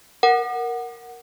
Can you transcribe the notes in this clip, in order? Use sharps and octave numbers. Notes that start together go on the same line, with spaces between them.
A#4 F#5